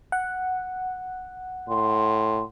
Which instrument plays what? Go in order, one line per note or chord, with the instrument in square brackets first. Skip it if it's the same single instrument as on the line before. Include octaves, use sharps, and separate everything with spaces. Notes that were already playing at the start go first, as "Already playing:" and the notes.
[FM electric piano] F#5
[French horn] A2 [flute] C6